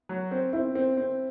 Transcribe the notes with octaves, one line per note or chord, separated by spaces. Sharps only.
F#3
C4
C4 E4
C4
C4